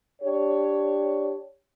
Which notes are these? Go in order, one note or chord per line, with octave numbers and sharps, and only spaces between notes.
D4 G4 C#5